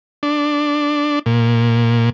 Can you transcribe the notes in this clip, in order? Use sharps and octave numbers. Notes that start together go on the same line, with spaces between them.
D4
A#2